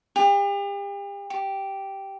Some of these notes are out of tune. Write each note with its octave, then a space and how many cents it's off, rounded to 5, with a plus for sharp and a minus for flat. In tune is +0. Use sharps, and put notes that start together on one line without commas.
G4 +40
G4 -5